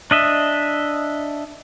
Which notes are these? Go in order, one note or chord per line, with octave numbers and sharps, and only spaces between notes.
D4 D#5 E5